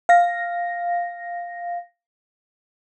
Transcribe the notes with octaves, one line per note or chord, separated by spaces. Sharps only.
F5 A#6